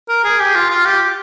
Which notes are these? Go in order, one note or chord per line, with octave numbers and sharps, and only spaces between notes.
A#4
G#4
G4
F4
F4
G4